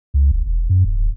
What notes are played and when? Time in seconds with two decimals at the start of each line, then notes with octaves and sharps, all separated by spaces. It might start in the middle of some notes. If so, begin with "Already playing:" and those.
0.14 C#2
0.31 D#1
0.46 E1
0.70 F#2
0.84 D1